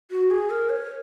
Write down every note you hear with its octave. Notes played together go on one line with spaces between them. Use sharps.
F#4
G#4
A#4
C#5